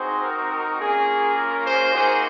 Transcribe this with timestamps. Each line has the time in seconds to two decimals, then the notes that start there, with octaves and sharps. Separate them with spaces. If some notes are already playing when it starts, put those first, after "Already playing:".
Already playing: C4 D#4 F#4 G#4 C5
0.23 A#4
0.52 A#4
0.80 A#3 C#4 F4 G#4
1.37 A#4
1.65 G#4 C5
1.94 A#3 D#4 F#4 G#4 C5